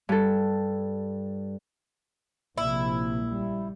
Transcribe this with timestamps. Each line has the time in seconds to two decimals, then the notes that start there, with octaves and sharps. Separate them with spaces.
0.09 G2 A4
2.58 A#1 C3 A#3 E4
3.25 C#2 G3